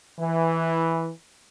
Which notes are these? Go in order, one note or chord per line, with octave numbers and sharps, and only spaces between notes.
E3